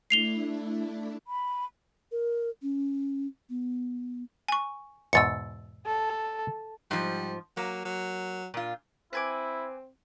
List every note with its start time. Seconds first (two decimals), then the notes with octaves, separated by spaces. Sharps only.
0.10 A3 D4 E4 C7 F7 G7
1.27 B5
2.12 A#4
2.62 C#4
3.50 B3
4.48 G#5 C#6
5.13 E2 G#2 B2 E6 A6 C#7
5.86 A4
6.91 G#2 F3 G3
7.57 F#3 A#3
7.85 F#3
8.54 A#2 F4
9.13 C4 E4 B4 G#5 D6